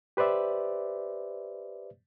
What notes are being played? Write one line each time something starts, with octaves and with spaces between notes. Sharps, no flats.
G4 B4 C5 D5 E5